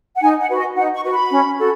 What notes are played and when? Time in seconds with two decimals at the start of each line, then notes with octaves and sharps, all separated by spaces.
0.16 F#5
0.22 D#4 G#5
0.40 F#5
0.49 F#4 B4
0.58 D#5
0.76 D#4 F#5
0.94 C#6
1.03 F#4 B4
1.12 B5
1.30 C#4
1.57 F#4 A4